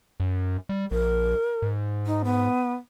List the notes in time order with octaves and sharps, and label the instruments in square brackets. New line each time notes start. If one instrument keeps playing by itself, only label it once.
[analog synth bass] F#2
G3
[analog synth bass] A#1 [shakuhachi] A#4
[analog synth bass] G#2
[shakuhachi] D#4
B3